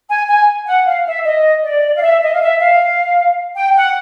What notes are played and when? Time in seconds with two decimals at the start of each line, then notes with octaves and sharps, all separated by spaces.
0.10 G#5
0.29 G#5
0.67 F#5
0.87 F5
1.06 E5
1.25 D#5
1.63 D5
1.96 F5
2.03 E5
2.22 D#5
2.34 F5
2.42 E5
2.60 F5
3.56 G5
3.76 F#5